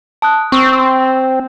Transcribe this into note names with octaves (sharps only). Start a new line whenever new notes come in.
A5 D#6 F#6
C4 C#6 E6